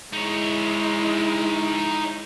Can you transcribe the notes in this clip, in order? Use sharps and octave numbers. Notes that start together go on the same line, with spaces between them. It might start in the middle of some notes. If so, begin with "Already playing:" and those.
G#3 D#4 E4 C#5